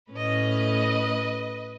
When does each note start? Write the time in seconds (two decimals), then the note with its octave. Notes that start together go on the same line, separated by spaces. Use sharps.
0.11 A2 A3 C#4 B4 D#5